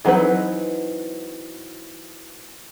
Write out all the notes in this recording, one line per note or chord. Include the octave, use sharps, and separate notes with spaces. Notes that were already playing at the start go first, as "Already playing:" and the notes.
E3 F#3 C4 D#4 B4